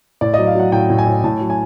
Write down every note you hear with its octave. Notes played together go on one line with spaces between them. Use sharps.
A2 D5
F#3 D#5
F5
F#3 F#5
A2 G5
A2
G#5
A2
A2 A5
F#3
G#5